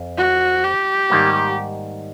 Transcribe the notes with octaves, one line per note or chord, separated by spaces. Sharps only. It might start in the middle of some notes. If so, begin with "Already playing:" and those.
Already playing: F2
F#4
G4
G#2 D#3 G3 A#3